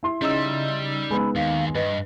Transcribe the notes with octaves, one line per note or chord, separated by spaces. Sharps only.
E4 C6
C#3 G3 D#4 E6
G#3 B3 B5
D#2 D#3 F5
G2 B4 D#5